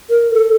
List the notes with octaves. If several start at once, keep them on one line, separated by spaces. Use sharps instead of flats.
A#4
A4